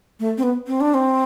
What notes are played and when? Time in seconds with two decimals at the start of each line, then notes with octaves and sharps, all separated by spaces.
0.20 A3
0.38 C4
0.43 B3
0.67 C4
0.81 D4
0.94 C4